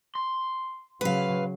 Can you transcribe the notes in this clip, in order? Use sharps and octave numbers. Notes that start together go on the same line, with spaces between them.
C6
C#3 F#3 B4 F5